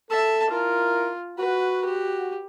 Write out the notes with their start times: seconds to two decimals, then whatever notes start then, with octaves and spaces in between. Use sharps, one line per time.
0.10 A4 E5 A5
0.50 E4 F4 A#4
1.38 F#4 B4
1.85 G4